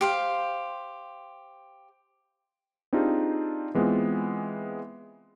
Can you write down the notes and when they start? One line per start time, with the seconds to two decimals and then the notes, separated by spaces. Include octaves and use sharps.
0.01 G4 C5 F5
2.93 C4 D4 D#4 F4 G4 G#4
3.74 E3 G#3 B3 C4 F4